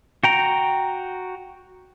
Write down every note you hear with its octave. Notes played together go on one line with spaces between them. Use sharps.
F#4 G5 A#5